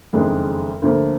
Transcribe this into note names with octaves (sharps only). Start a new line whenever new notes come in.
F#1 F2 D#3 G#3 D4
D2 D3 F3 A#3